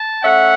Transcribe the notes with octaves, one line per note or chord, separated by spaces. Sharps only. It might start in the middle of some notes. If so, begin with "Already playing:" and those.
Already playing: A5
A3 C#4 E5 F#5